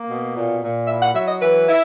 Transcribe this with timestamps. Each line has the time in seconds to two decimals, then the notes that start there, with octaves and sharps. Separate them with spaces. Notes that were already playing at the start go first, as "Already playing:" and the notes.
Already playing: A#3
0.08 B2
0.35 A#2
0.62 A#2
0.88 E4 E5
1.02 F#5
1.14 F#3 E5
1.27 D#5
1.41 E3 B4
1.67 E4